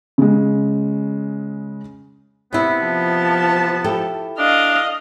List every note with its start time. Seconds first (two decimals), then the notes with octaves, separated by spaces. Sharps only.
0.18 C#3 G#3
2.53 C3 B3 E4
2.85 F3 A5
3.84 E4 G4 A4
4.39 D4 D#5 F5